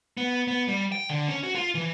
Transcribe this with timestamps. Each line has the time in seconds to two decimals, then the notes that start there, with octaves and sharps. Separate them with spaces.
0.17 B3
0.48 B3
0.68 G3
0.92 G5
1.09 D3
1.28 C#4
1.43 F#4
1.55 F4
1.75 E3